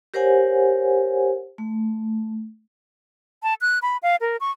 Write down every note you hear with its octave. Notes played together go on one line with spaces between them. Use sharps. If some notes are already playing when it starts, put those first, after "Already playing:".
G4 A#4 C5 C#5 F#5 G#5
A3
A5
F#6
B5
F5
A#4
C#6